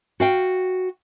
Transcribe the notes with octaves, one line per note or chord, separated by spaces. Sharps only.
F#4 F5 G5